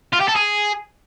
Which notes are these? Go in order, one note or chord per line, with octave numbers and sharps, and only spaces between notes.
F4
G4
A4
G#4